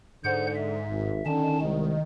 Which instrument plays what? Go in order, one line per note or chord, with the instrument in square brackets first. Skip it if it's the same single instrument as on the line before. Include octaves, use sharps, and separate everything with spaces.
[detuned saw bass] G#2 [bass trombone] D3 [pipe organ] C5 F#5 G6
[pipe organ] E5
[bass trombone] G#1
[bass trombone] D3 [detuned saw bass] D#3 [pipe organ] C#4 A5
[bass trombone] C2 [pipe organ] G#3